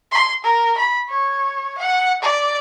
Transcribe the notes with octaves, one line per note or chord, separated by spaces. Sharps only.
C6
A#4
B5
C#5
F#5
D5